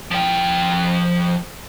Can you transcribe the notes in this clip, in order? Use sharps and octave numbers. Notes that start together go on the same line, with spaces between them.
F3 G5